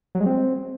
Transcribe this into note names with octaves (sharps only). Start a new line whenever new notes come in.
F#3
G#3
C4